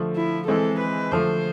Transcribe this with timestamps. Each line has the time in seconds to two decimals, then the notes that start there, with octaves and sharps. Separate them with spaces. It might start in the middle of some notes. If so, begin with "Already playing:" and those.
Already playing: D3 F3 A3
0.16 E4
0.48 E3 G#3 C4 A4
0.80 B4
1.11 D3 F3 A3 C5